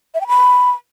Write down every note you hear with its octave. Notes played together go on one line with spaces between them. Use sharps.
E5
G5
B5